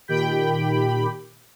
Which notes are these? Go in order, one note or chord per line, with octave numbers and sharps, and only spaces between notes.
A#2 D#3 G4 G5 B5